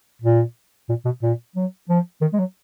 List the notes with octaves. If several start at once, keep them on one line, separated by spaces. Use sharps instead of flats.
A#2
A#2
B2
A#2
F#3
F3
D#3
G#3
F#3